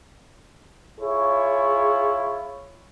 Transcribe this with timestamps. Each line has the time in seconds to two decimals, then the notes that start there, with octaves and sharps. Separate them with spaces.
0.99 E4 F4 G#4 C#5